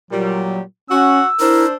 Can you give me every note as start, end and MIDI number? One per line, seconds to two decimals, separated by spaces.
0.11 0.60 46
0.11 0.61 54
0.11 0.60 55
0.90 1.21 61
0.90 1.28 66
0.90 1.28 78
0.90 1.75 88
1.40 1.73 62
1.40 1.66 64
1.40 1.65 70
1.40 1.73 72